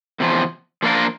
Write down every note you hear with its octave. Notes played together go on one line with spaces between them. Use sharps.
E2 C3 F3
F3 A#3 D4 F4 A#4